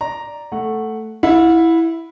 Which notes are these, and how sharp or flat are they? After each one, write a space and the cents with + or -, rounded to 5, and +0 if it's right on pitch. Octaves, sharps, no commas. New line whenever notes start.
D5 +0 A#5 +0
A3 +0 F#5 +0
E4 +0 F#5 -40